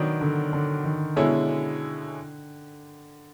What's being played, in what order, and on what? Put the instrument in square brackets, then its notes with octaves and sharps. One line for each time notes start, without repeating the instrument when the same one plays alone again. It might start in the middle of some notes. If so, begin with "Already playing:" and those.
Already playing: [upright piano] B2 F#3 B3 D4 [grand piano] D#3
[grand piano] D3
D3
D#3
[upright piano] B2 G#3 C#4 E4 A4 [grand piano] D3